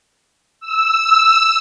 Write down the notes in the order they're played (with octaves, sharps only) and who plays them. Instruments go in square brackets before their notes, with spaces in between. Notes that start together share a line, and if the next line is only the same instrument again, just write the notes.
[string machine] E6